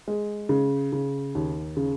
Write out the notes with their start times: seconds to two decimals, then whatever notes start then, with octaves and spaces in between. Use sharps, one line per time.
0.08 G#3
0.49 C#3
0.93 C#3
1.35 D#2
1.77 C#3